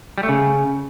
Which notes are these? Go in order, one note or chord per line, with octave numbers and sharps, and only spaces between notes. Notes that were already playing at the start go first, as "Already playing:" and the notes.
G3
A3
C#3